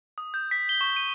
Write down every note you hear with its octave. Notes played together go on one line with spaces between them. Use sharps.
D#6
G6
B6
G7
C#6
D#7